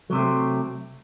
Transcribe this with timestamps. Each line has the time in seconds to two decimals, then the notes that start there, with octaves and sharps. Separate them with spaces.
0.10 F#3
0.13 C3
0.15 A3
0.18 C4